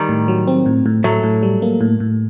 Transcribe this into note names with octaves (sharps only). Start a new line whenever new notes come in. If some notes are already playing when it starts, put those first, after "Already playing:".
Already playing: D#3 G3
A2
F#3
C4
A2
A2
A2 F#3 A3
A2
G3
A#3
A2
A2